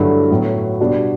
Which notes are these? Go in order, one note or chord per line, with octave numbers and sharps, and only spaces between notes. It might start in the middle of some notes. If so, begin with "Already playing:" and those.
Already playing: G2 D3 F#3 A3 E4
A2 F#3 B3
B2 G3 B3 D4 F#4